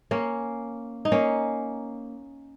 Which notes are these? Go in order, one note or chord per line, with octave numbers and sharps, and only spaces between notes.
A#3 C#4
D#4
A#3 C#4